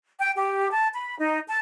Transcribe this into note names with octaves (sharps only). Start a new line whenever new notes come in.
G5
G4
A5
B5
D#4
A5